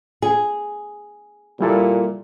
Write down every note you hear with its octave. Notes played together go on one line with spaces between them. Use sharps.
G#4
A#2 G3 E4 A4